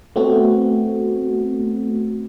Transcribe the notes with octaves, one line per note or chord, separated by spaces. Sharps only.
A3 B3 C4 F#4